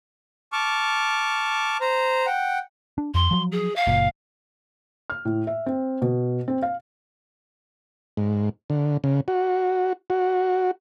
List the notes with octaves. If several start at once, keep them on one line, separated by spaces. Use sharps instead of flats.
A5 C#6 D6 F6
C5 A#5
F#5 G5
D4
F2 C6
F3 F#3
G#4
F5
F#1 A#2
F6
A2
E5
C4
B2
C4
F5
G#2
D3
C#3
F#4
F#4